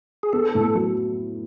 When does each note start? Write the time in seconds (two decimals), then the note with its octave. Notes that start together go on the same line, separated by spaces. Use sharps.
0.23 G#4
0.33 B3 A4
0.55 A2
0.75 F#3